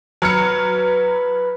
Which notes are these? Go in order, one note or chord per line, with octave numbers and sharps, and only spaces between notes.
F#3 B4 F6 C#7